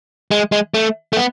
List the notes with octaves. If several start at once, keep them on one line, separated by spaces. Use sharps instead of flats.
G#3
G#3
A3
A3
B3